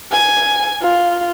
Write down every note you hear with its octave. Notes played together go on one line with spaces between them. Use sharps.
G#5
F4